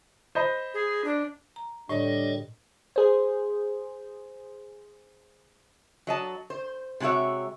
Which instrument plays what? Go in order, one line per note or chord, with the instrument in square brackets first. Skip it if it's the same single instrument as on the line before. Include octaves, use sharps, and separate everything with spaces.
[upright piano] C5 D#5 B5
[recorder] G#4
D4
[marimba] A#5
[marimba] A2 [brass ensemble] D3 G3 D4 [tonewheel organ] G4 A4 C#5 [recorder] D#5
[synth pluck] G#4 C5
[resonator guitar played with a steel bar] F#3 D#5 A5
C5
C3 G#3 F#4 C#5 E5